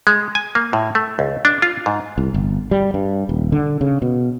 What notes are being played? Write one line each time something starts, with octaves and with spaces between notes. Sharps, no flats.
G#3
G#5
A#3
A2
A3
C#2
D4
F4
G#2
C2
G1
G3
G2
D#1
D3
C#3
B2